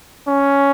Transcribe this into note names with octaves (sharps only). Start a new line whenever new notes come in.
C#4